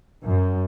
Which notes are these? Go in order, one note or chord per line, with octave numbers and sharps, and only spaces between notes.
F#2